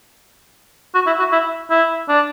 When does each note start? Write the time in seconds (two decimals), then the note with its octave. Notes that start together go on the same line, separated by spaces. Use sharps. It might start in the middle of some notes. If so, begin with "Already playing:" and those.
0.95 F#4
1.06 E4
1.19 F#4
1.32 E4
1.70 E4
2.08 D4